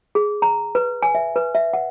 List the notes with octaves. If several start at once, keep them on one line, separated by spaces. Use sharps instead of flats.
G#4
A#5
B4
G#5
E5
B4
E5
F#5